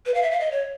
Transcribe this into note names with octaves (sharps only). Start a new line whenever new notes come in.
B4
F5
E5
F5
D#5
C#5